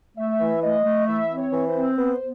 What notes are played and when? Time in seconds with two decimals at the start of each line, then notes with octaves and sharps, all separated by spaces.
0.17 A3 E5
0.40 E3
0.62 A3 D#5
0.85 A3
1.07 E3 E5
1.30 C4
1.37 C#5
1.52 E3
1.68 C5
1.74 C4
1.97 B3 C5
2.19 B3